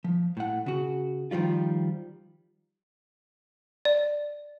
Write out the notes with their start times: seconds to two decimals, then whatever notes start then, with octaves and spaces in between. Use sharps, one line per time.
0.04 F3
0.37 A2 F#5
0.66 C#3 F#4
1.31 D#3 F3 G3 F4
3.85 D5